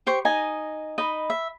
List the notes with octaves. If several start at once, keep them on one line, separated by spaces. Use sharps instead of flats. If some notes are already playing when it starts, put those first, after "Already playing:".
G4 C5 C#6
D#4 D#5 G#5
D#4 D#5 B5
E5